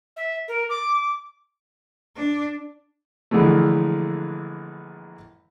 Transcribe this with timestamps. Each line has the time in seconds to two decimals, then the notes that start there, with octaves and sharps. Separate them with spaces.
0.17 E5
0.48 A#4
0.70 D6
2.16 D4
3.31 A#1 D3 E3 F3 G#3 A3